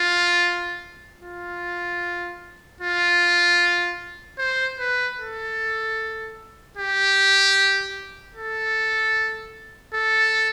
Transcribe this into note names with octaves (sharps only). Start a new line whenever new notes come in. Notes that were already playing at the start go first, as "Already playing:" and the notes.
Already playing: F4
F4
F4
C5
B4
A4
G4
A4
A4